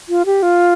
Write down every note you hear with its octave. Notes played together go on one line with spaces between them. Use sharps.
F4
G4
F4